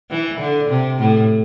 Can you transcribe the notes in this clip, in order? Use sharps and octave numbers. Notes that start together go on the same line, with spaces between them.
E3
D3
C3
A2